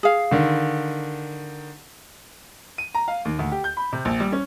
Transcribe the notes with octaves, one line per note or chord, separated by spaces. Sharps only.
G#4 F5
D3 D#3
D#7
A#5
F5
D#2
D2
G4
G6
B5
C3
A#1
G3
C#4